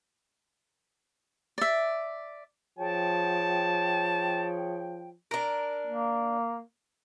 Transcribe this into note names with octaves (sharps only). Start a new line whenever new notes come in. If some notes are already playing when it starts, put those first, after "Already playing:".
D5 E5
F3 G#4 C#5 G5 A5
D4 A#4
A#3